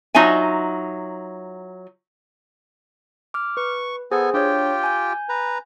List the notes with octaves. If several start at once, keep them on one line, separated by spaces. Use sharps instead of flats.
F#3 D#4 F4 E5 G#5
D6 F6
B4 C#6
B3 G#4 A4 C5 G#5
D4 F4 G4 C#5 G5
G#5 G6
B4 A#5